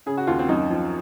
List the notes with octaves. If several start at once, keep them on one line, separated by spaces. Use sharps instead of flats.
C#3 G#4
F#4
D#2 F4
C4
F#2 D#4
F3